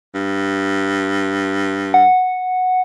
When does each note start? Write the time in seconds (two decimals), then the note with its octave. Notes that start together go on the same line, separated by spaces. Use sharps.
0.15 G2
1.94 F#5